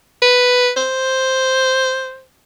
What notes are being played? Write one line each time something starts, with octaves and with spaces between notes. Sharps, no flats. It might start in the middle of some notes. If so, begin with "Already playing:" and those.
B4
C5